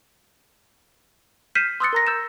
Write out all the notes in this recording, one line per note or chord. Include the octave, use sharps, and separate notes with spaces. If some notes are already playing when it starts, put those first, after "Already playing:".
F6 G6 B6 C7 D#7 E7
C6 D#6 E6 F#6 A6 C#7
A#4 A#5 A#6
E6 G6 A6 E7